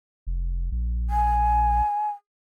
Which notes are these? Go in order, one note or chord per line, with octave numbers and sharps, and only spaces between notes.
F1
A#1
G#5